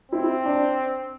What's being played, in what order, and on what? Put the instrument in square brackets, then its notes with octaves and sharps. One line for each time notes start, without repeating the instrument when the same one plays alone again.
[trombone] C4 [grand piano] E4
[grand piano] D4